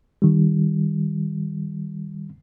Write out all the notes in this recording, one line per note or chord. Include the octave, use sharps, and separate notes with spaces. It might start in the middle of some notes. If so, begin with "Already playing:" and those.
D#3 G3